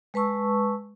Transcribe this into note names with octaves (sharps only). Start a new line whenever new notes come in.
G#3 B4 A5 C#6 E6